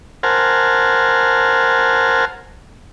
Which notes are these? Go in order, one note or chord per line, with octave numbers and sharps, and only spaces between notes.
A#4 C5 F#5 G#5 A5 F6